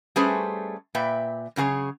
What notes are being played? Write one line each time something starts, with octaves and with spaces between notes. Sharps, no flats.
G3 A3 C#4 G#4 B4 C5
A#2 B4 E5 G5
F#2 C#3 F#4 G#4 C#5